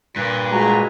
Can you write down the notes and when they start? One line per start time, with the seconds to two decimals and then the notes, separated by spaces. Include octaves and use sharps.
0.16 G2 A#2 B4 G#5
0.52 G#3 F4 F#4 A#5